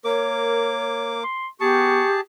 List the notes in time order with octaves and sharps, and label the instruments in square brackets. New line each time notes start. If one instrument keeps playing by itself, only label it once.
[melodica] A#3 D6 [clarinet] A#4 [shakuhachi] C#5
[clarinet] C6
[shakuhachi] B3 [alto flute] G4 [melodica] G#4 A5 [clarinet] C#6